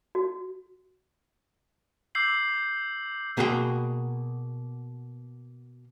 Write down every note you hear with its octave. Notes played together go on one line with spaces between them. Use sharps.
F#4
D6 E6 G6 C7 F#7
B2 A#3 F#4 G#4 A#4 G5